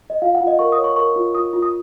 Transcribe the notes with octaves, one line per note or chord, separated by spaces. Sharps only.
D#5
F4 F5
F#5
F4
D#5
A#4 C#6
D#6
C#5
C#6
A#4 C#6
F4
F4 D#6
F4
D#6